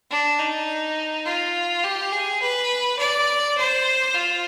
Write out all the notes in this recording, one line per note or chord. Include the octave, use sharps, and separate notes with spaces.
D4
D#4
F4
G4
G#4
B4
D5
C5
F4